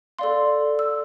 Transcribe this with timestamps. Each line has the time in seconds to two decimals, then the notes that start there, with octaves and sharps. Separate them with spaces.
0.19 A4 D5 F5 C6
0.79 E6